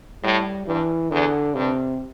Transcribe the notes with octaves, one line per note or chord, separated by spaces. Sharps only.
A2 G3
G2 E3
E2 D3
G2 C3